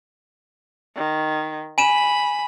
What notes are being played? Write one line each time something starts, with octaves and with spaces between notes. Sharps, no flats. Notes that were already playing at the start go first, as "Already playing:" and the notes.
D#3
G#5 B5 D#7 E7